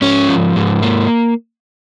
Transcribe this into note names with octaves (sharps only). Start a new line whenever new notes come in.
G#2 C#4
F3
G#2
A#3